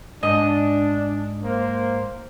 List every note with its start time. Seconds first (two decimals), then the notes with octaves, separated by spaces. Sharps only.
0.23 G#2 D4 D#5
1.43 A#3 C5